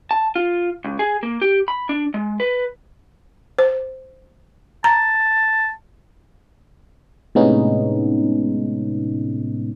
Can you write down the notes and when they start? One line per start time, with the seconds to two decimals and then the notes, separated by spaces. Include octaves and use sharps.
0.11 A5
0.36 F4
0.84 C#2
0.99 G#4
1.23 A#3
1.42 G4
1.68 B5
1.89 D4
2.14 G#3
2.40 B4
3.59 C5
4.84 A5 A#5
7.35 A2 C3 G#3 B3 C#4 D#4